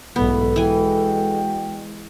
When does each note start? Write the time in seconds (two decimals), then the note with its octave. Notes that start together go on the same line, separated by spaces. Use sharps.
0.16 B1 G#2 C#3 E3 A3 B3 A4
0.56 E3 G#3 F#4 G5 G#5